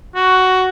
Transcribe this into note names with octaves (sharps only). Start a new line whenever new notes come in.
F#4